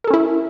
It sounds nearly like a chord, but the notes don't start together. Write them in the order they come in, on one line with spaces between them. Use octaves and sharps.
A#4 A4 C#4 E4